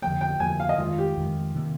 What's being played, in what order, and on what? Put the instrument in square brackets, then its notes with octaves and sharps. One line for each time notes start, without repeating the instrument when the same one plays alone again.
[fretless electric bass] F2 D3 F3 A#3 [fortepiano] G5
[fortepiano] G5
[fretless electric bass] F2 D3 F3 A#3 [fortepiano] G#5
[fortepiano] F5
D#5
[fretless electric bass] F2 D#3 G#3 [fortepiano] F4
[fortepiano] G4
[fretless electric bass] F2 D#3 G#3
C3 D#3 A#3